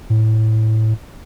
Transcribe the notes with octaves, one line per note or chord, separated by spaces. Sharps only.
A2